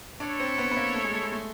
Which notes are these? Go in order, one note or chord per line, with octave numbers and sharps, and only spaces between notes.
D4 E4 A4 C#5
C4
B3
B3
A#3
A3
G#3
A3
G#3
A3